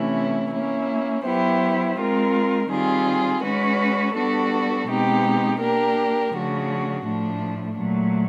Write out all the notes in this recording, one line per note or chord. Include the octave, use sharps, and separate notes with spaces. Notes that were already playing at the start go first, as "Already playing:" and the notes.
Already playing: C3 E3 A3 C#4 E4
A#3 C#4 E4
F#3 B3 E4 G4 C5
G#3 C4 F4 A#4
D#3 G3 C4 F4 G#4
G#3 C#4 F#4 B4
G3 B3 D4 F#4 A4
B2 G#3 C4 D#4 G4
A#3 D4 G4 A#4
C#3 F3 A3 D4 F#4
A2 F3 A3 D4
A#2 F#3 A3